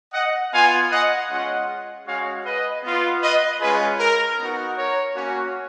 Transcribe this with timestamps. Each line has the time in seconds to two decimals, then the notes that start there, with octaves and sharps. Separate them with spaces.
0.14 D#5 F#5
0.52 B3 F4 F5 G#5
0.92 D#5 F#5
1.29 G#3 C#4 F4 D#5 F#5
2.06 G#3 C#4 F#4 C#5 F5
2.45 B4 D#5
2.84 B3 F4
3.22 B4 D#5
3.61 G#3 C#4 F4 G#4 B4
3.99 A#4
4.38 B3 D#4 F#4
4.77 A#4 C#5
5.15 A#3 C#4 F#4